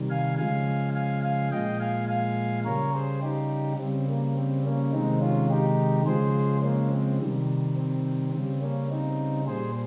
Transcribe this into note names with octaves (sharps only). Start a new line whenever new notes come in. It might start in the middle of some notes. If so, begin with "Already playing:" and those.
Already playing: C3 D#3 G3
F5 G#5
C#3 F3 G#3 F5 G#5
F5 G#5
F5 G#5
A#2 F3 G#3 D#5 G5
F5 G#5
F5 G#5
C#3 G3 A#4 C#5
G#4 C5
D#4 G4
C#3 G3 C4
A#3
C4
A#3 C#4
C3 D#3 G#3 C4 D#4
C#4 F4
D#4 G4
C#3 F3 G#3 G#4 C5
A#3 C#4
C4
C3 D#3 G3
C4
C#3 G3 C4
A#3 C#4
C4 D#4
A#2 G3 G#4 C5